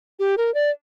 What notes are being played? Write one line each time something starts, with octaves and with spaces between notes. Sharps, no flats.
G4
A#4
D5